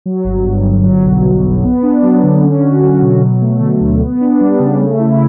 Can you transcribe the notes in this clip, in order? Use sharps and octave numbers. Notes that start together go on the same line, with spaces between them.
F#3
G1
G2
G1
F#3
B1
B2
B1
B3
D4
F#3
D3
C#4
F#4
F#3
B2
F#3
A3
D3
D2
B3
D4
G3
C#3
A3
E4